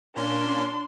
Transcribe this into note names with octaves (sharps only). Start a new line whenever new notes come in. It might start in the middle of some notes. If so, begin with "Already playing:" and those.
A#2 A#3 C#4 D4 C6